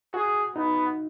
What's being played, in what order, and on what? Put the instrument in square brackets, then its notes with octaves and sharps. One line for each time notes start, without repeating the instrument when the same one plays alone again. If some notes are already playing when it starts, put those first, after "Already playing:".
[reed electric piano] F#4 [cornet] G#4
[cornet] B3 [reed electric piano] D#4